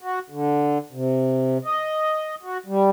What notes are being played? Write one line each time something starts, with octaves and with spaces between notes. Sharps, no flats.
F#4
D3
C3
D#5
F#4
G3